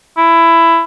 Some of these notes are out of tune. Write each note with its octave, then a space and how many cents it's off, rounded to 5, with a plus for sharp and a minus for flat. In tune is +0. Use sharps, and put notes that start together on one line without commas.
E4 +15